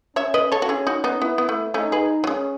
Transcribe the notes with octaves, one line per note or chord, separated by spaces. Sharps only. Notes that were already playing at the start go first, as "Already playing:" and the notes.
C#4 C#5 E5
B4 D#5
A4 C#5
F#4
C#4 E4 G#4
D#4 F#4
B3 D#4
B3 E4
B3
A3
A3 C#4 D#4
G#4 B4
F#3
G#3 C#4